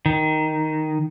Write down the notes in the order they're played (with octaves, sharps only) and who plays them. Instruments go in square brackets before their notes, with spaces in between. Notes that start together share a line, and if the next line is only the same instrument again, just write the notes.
[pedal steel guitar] D#3